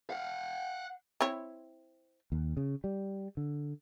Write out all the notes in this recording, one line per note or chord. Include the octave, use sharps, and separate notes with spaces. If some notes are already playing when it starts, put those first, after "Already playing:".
F5 F#5
C4 E4 C#5
D#2
C#3
G3
D3